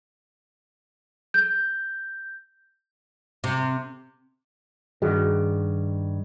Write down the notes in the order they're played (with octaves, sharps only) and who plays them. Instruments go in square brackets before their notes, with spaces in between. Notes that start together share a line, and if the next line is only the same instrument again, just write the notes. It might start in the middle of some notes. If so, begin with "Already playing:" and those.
[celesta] G6
[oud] C3
[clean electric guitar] G2 D#3 [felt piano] F#4 G#4